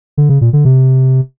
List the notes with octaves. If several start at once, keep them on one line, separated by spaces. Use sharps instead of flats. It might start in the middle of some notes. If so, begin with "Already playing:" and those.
D3
C#3
A#2
D3
C3